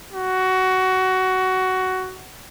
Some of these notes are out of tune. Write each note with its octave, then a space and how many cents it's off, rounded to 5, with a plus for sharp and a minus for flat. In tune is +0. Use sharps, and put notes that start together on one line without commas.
F#4 +15